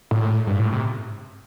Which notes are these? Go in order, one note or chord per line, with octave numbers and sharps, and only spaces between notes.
A2
G2
A2
C3